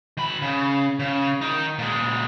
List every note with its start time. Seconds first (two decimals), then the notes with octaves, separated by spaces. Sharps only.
0.17 D#3 B5
0.42 C#3
0.99 C#3
1.41 D#3 D#4
1.79 A#2 G#3